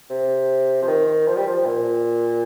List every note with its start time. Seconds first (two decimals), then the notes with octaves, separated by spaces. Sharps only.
0.10 C3
0.82 F3
0.88 D#3
1.27 F3
1.37 G3
1.47 F3
1.66 A#2